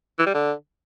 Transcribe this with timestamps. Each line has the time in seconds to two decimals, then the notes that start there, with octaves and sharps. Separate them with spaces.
0.18 E3
0.26 G3
0.34 D3